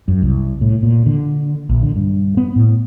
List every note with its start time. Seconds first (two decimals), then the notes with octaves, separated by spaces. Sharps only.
0.08 F#2
0.22 C2
0.61 A2
0.83 A#2
1.06 D3
1.69 A#1
1.83 D3
1.96 G2
2.37 B3
2.56 A2